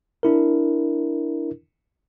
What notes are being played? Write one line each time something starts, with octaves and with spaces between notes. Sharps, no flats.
D4 E4 A#4